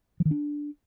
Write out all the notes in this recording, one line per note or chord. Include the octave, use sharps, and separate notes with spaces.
F3
D#3
D4